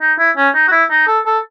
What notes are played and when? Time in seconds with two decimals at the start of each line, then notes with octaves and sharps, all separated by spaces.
0.01 D#4
0.19 E4
0.37 C#4
0.55 D#4
0.68 F#4
0.72 E4
0.90 D#4
1.07 A4
1.26 A4